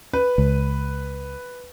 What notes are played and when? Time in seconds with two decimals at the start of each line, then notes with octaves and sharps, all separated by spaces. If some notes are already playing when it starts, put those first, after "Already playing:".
0.13 B4
0.38 C#2